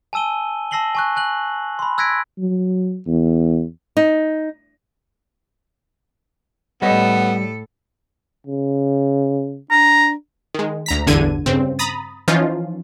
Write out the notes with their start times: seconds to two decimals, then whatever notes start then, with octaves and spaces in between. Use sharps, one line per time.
0.13 G#5 A5 E6 D#7 G7
0.71 A5 E6 A#6 C7 F#7 G7
0.95 G#5 C#6 F#6
1.16 G#5 F#6 F#7
1.79 B5 C6
1.98 E6 F#6 G#6 A#6 B6 D7
2.38 F#3
3.07 E2
3.97 D#4
6.82 A2 G3 B3 A4 C#5 D#5
8.47 C#3
9.71 D4 A#5
10.54 D#3 G#3
10.86 D2 A#5 B6
11.07 A1 E2 G2 D3 G#6 D#7
11.46 G2 C#3 C4
11.79 A#5 B5 D#6 A6
12.28 E3 F3 C#4 D#4 F4